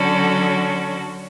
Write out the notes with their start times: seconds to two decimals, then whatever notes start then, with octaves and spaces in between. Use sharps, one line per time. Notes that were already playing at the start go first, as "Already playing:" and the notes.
Already playing: D3 F#3 C#4 F#4 A4